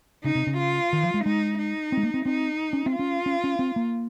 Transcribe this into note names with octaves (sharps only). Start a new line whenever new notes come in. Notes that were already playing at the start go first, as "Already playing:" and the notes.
C#3 D#4
C3
C#3
F4
D#3
F3
G#3
G#3 D#4
D#4
C4
G#3
A#3
C4
C4 D#4
C#4
C4
F4
C#4
C#4
C#4
C4
A#3